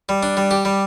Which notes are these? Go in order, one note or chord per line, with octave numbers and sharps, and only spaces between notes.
G3
D4
G3
G4
G3